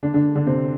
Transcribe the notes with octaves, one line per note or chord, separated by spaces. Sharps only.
D3 D4
D3 D4
D3 D4
C3 C4